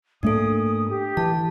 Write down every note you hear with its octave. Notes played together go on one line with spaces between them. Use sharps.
G#2 A3 A#3 D4 A4 D#6
D#6
G4
E3 A5